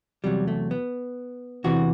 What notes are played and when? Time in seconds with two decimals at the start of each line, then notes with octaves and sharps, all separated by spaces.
0.24 E2 C3 F#3 G3
0.48 A3
0.71 B3
1.64 E2 C3 E3 F#4